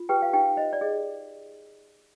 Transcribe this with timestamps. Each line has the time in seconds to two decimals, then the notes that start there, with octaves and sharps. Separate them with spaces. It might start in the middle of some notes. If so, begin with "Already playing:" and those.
Already playing: F4
0.09 G4 B4 G5
0.22 F5
0.33 D#4 G4 G5
0.57 C5 D#5
0.73 D5
0.81 G#4 D#5